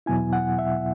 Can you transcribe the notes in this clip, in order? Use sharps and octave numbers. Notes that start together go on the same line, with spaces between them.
E2 B2 F#3 B3 E4 G#5
F#5
E5